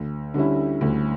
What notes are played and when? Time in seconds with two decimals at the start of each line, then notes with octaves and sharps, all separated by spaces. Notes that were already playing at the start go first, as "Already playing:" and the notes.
Already playing: D2
0.34 D3 G3 C#4 E4
0.81 D2